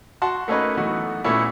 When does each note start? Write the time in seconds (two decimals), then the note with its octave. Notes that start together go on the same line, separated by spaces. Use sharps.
0.22 F#4 A5 C6
0.48 A3 A#3 C#4 D#4 B4
0.77 E3 F#3 A3 B3 D#4 F#4
1.24 A#2 A3 B3 C#4 E4